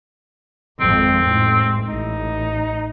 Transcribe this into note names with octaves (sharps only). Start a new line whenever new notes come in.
G#1 F2 C4
A1 G#2
A1 D#4